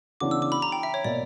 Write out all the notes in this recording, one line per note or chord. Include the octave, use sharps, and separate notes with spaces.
C#3 E3 B3 D4 F#4 D6
E6
D6
B5
A#5
G5
E5
C#5
B2 A#3 D5